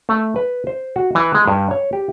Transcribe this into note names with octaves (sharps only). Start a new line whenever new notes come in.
A3
B4
C5
F#4
E3
G#3
G2
C#5
G4